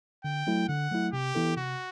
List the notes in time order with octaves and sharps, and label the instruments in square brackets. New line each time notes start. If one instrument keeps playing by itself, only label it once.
[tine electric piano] D3 [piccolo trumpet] G5
[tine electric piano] F#3 A3 E4
[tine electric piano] D3 [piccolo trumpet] F#5
[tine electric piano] F#3 A3 E4
[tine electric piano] C3 [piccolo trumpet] G4
[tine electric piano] E3 B3 E4 A4
[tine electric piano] C3 [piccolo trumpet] F#4